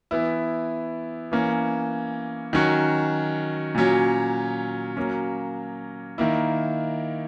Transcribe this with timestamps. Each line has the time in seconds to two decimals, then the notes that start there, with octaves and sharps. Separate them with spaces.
0.11 E3 B3 E4
1.31 E3 A#3 C#4
2.53 D#3 F#3 C#4 F#4
3.75 A#2 F#3 C#4
4.97 F#3 A#3 C#4
6.18 D#3 A#3 E4